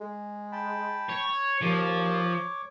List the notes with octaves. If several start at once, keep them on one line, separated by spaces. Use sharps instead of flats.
G#3
G5 A5 B5
C#5
D#2 F3 C#5 D6